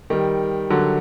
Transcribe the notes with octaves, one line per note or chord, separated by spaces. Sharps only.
D#3 G3
D3 F#3